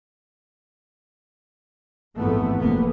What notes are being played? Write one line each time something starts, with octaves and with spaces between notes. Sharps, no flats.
A1 F2 G#2 E3 A3 B3
F1 A#3 B3